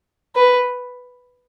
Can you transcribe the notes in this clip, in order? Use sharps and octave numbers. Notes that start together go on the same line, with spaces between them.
B4